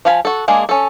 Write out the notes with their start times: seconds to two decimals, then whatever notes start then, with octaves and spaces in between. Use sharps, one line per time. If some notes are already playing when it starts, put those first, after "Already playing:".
0.05 F3 F4 F5 G#5 B5
0.25 F#4 A4
0.48 G#3 A#3 D4 G#4
0.69 C#4 A4